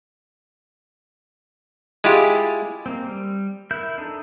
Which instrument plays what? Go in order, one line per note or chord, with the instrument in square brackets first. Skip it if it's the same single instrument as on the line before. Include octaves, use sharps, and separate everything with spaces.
[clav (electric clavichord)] G#3 E4 F4 G4
[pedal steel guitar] A#3 C4
G3
E4 A#4 E5 G6
D4 D#4 A4